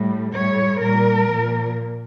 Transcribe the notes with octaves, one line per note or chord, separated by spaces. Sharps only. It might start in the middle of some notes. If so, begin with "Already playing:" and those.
Already playing: A2 G3
A2 G3 C#5
A#2 G3 A#4
A#2 F3